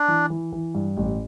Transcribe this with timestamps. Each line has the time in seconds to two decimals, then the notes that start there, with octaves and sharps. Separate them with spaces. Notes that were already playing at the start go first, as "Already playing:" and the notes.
Already playing: D4
0.08 E3
0.30 E3
0.52 E3
0.75 G2
0.97 A1